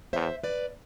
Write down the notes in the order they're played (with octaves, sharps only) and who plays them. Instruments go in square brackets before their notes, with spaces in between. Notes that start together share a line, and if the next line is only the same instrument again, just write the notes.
[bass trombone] E2 [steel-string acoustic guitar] C5 E5
[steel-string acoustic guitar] B4 D5